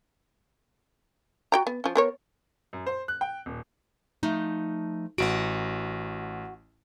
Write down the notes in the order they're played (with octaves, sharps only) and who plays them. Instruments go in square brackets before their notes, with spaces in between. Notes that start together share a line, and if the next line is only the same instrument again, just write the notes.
[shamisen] F#4 G5 A#5
B3
F3 C#4
B3 A#4 C#5
[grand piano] F#2
C5
F#6
G5
D#1
[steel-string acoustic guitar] F3 A3 D#4
[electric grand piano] A1 D7 [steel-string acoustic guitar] F#4 F#5